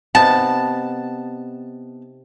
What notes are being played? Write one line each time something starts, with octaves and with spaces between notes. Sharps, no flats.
C3 B3 D#4 A5